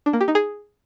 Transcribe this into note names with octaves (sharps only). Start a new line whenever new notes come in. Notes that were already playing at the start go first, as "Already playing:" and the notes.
D4
A#3
G4
D#4
G#4